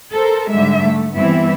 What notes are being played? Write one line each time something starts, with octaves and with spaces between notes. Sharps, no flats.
A4 A#4 C5
G#2 D3 G3 G#3 E5
A3
G2 E3 B3 C4 E4 E5